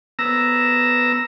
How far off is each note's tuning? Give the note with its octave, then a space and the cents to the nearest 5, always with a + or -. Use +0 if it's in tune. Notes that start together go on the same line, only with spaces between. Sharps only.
B3 +0 A#5 +0 E6 +0